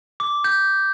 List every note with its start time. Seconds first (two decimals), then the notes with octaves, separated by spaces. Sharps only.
0.20 D6
0.44 G6